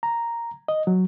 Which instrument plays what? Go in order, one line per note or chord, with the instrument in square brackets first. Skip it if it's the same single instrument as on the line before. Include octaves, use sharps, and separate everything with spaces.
[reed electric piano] A#5
D#5
F#3